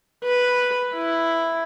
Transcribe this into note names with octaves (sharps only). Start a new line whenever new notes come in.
B4
E4